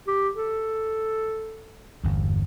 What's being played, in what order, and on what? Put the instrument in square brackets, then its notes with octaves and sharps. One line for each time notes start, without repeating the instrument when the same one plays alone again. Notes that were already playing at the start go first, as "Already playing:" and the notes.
[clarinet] G4
A4
[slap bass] G1 E2